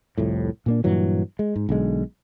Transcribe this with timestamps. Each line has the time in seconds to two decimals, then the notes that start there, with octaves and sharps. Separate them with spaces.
0.18 C2 F2 A2
0.66 A#2 A#3 D4
0.84 G2 A#2 E3 F#3
1.39 G#3
1.56 G#2
1.69 B1 D3 G#3